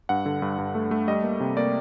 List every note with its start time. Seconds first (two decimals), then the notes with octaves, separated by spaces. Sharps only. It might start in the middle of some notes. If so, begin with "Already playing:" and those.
0.09 G2 F#5
0.26 D3
0.42 G2
0.58 G2
0.75 A3
0.91 A3
1.08 G3 D#5
1.24 A#3
1.40 C3
1.57 A#3 D5